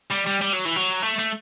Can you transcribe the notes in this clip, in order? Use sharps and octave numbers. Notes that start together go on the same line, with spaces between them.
G3
G3
G3
F#3
E3
F#3
A3
A3